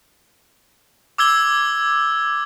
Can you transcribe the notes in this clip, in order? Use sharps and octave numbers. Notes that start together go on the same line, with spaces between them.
D6 E6 G#6 G7